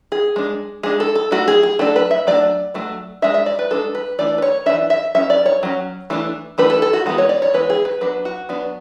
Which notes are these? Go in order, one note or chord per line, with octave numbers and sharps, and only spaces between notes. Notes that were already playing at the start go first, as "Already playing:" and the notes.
G#4
G#3 D4
G#3 D4 G#4
A4
A4
F#3 A3 D4 F#4
G#4
G#4
F#3 A3 D4 A4
B4
E5
F#3 A3 D4 D5
F#3 A3 D4
G#3 D4 E5
E5
D5
B4
G#3 D4 A4
B4
E3 A3 D4 D5
B4
C#5
E3 A3 D4 E5
E5
F#3 C#4 E5
D5
C#5
F#3 C#4
E3 A3 D4
E3 A3 D4 B4
A4
A4
F#4
E3 G#3 B3 F#4
C#5
D5
C#5
E3 G#3 B3 B4
G#4
B4
F#3 B3 D4 B4
F#4
F#3 B3 D4